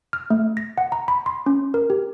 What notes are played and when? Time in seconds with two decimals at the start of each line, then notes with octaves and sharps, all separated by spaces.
0.13 F6
0.30 A3
0.57 A#6
0.78 F#5
0.92 A#5
1.08 B5
1.26 C6
1.46 C#4
1.74 A#4
1.90 G4